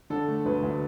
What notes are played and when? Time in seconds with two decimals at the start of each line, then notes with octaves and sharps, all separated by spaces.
0.10 D3 A4
0.27 A3
0.45 D2 B4
0.62 D2